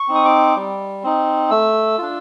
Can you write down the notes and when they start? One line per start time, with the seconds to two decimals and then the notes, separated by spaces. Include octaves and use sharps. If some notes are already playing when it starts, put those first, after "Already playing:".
Already playing: C#6
0.08 C4 D#4
0.15 D#6
0.25 D6
0.56 G3
1.03 C4 D#4
1.50 A3 E6
1.98 D4 F4